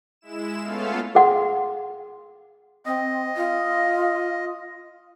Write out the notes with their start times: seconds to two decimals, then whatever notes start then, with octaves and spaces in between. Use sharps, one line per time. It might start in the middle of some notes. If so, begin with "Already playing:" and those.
0.21 G#3 E4 E7
0.61 A3 B3 C#4 F4 A4 F5
1.15 G#4 F5 F#5 C6
2.86 C4 D#5
3.36 F4